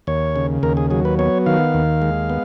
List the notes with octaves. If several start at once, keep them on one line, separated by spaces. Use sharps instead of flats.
D#2 C#5
C#3
D#2 A#4
G#4
F#3 G#4
B4
B3 C#5
D#3 F5
D#2
G#3
B3